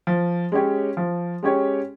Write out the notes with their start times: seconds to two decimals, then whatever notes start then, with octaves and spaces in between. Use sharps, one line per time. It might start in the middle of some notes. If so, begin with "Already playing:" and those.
0.07 F3
0.52 G#3 C#4 G4 C#5
0.97 F3
1.43 G#3 C#4 G4 C#5